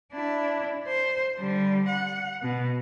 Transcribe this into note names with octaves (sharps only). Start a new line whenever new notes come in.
D4 E4
C5
D3 G3
F#5
B2